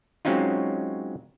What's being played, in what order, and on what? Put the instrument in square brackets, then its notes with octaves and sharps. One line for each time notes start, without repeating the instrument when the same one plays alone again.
[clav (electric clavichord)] F#3 G#3 C4 C#4 D#4 F4